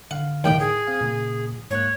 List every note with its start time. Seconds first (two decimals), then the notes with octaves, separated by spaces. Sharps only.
0.11 D3 F5 F#5
0.44 D#2 A2 D#3 G5
0.60 G#4
0.87 C4 F5
1.01 A#2 C#3 A#3
1.71 G#2 A#3 C#5 F#6